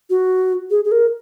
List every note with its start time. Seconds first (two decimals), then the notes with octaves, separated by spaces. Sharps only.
0.10 F#4
0.71 G#4
0.84 G#4
0.92 A#4